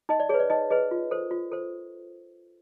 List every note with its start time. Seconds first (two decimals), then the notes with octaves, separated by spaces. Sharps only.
0.09 D#4 D#5
0.20 D5
0.29 G#4 B4 C#5
0.40 D5
0.50 D#4 D#5
0.70 G#4 B4 D#5
0.91 F4
1.11 A4 C5
1.31 F4
1.52 A4 C5